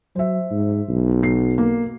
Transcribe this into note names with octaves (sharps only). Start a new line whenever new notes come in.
F#3 C5 E5
G#2
B1
F#3 C7
A#3